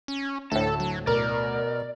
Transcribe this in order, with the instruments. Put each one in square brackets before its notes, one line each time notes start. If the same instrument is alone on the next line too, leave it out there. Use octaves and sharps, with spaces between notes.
[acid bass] C#4
[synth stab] D2 A2 [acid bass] A4 [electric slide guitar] A5
[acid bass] F#3
[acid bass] B2 [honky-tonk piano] A#4 [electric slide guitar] D5